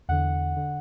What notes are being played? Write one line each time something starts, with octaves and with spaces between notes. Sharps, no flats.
E2 D3 F#5
D3